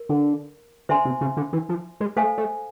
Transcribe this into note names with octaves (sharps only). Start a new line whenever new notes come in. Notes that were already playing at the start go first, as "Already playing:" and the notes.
Already playing: A#4
D3
D3 C5 E5 G#5 C6
C3
C#3
D3
E3
F3
G#3
A3 A4 C5 F5 G#5
A3